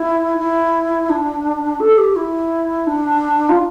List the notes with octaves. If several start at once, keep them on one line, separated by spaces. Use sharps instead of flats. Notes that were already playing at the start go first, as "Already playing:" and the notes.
Already playing: E4
E4
D4
A4
G4
E4
D4
F4